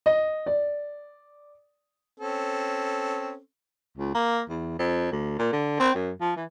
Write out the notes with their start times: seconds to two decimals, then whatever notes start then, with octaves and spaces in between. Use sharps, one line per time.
0.06 D#5
0.46 D5
2.19 C4 C#4 A4
3.97 C#2
4.15 A#3
4.49 E2
4.79 F2
5.12 D2
5.39 A#2
5.53 D3
5.80 C4
5.95 F#2
6.21 F3
6.37 E3